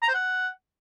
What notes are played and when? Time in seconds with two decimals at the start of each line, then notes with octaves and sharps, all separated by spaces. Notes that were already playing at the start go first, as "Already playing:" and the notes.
0.02 A#5
0.08 C5
0.14 F#5